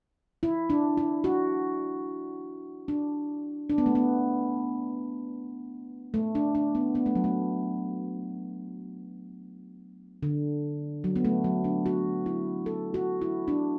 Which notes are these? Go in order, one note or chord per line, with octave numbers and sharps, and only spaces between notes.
E4
D4
E4
F#4
D4
D4
B3
A3
B3
A3
D4
D4
B3
B3
A3
F#3
A3
D3
F#3
B3
A3
F#3
D4
F#4
E4
A4
F#4
E4
D4